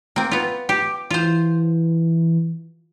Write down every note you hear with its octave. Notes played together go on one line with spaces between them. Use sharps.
A#3 C4
B3 F4
G4 D6
E3 F4 C5